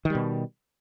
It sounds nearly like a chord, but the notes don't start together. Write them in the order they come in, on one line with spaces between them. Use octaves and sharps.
D#3 G3 B2